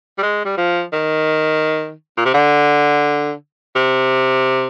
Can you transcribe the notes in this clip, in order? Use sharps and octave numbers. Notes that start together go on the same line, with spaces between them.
G3
G#3
G3
F3
D#3
A#2
C3
D3
C3